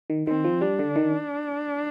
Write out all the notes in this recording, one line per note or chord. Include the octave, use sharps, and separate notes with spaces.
D#3
D#3 C4
F3
G3 D4
D3
D#3